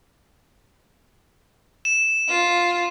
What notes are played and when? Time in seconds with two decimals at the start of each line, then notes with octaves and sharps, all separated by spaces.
1.85 E7
2.29 F4